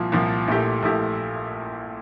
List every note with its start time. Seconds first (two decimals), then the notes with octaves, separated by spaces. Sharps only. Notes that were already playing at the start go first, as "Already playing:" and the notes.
Already playing: C2 A#2 F3
0.12 C2 A#2 F3
0.48 A#1 A#2 A3 E4 G4
0.83 A#1 A#2 A3 E4 G4